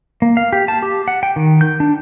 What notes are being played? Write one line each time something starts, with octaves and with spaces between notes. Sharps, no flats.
A#3
F5
G4
A5
G4
F#5
G5
D#3
G6
D4